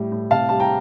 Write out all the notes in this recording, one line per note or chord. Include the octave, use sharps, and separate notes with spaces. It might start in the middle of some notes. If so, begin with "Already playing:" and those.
Already playing: A2 G3
A2
C3 F5 A5
G3 A5
G5 A#5